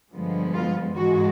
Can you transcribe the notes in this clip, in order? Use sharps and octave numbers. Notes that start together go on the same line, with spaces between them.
G2 D3 F3 G#3 B3
F4
G#2 E3 G#3 F#4